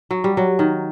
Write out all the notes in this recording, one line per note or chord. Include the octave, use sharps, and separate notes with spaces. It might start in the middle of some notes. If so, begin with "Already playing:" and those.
F#3
G3
F#3
D#3